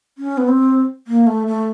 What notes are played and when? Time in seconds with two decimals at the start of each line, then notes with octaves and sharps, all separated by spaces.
0.18 C#4
0.38 B3
0.48 C4
1.07 A#3
1.27 A3
1.47 A3